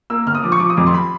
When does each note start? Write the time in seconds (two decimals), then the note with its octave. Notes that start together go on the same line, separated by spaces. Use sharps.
0.10 A#3 E6
0.26 G1 F6
0.35 D#6
0.43 F3 D6
0.52 C#6
0.60 F3 D6
0.70 D#6
0.77 F2 D6
0.87 C6
0.94 B5